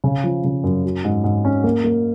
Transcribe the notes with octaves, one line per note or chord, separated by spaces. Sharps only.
C#3
F3
C#3
F#2
F#3
G#2
G#2
C#4
A#3
A#3